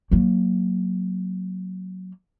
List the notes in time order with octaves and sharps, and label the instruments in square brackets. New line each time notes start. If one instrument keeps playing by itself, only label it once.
[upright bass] F#3 A#3